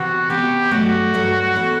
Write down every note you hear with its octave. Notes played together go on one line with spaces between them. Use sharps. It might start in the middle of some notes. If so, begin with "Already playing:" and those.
Already playing: C3 E3 B3 F#4
C3 E3 B3 G4
G2 F#3 A3 F#4
G2 F#3 A3
E3 B3 E4